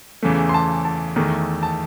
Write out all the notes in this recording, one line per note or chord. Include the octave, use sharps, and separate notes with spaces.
E2 C#3 E3 A3
C6
A5
A5
E2 D#3 A3
A5